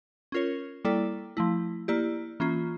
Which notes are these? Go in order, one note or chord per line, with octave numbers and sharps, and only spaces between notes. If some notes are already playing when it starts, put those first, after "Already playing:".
C#4 F4 A#4 C#5
G3 A#3 E4 A4 D5
F3 A3 E4
A#3 E4 G4 D5
E3 A#3 C#4 F4